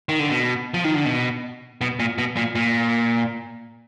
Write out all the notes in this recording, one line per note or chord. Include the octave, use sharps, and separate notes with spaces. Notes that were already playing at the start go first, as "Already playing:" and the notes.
D#3
D3
B2
F3
D#3
D3
B2
B2
A#2
B2
A#2
A#2